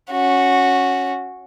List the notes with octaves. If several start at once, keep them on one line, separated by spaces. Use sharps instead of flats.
C#4 F#4